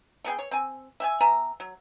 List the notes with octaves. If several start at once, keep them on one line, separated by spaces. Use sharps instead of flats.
A3 B3 G#4 G5
C#5
C4 G#5
E5 G5 G#5
B3 E5 G#5 A#5
F#3